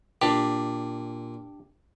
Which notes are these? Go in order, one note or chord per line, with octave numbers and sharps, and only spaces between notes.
A#2 D4 G4